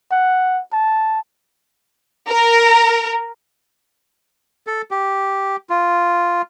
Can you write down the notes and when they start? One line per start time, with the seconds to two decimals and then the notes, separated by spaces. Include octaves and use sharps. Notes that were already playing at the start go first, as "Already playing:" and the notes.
0.11 F#5
0.73 A5
2.29 A#4
4.67 A4
4.91 G4
5.70 F4